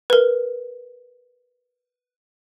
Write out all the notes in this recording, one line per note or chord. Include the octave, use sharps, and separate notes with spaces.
A#4 B4